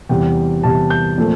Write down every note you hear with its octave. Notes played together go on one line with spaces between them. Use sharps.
E2 C3 G3 G5
E2 C3 G3 A5
G6
A#2 F3 A3 C4